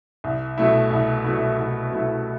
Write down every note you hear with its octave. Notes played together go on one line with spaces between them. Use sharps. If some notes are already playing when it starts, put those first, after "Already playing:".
C2
B2 A3 E4
C2
B2 A3 E4
C2
B2 A3 E4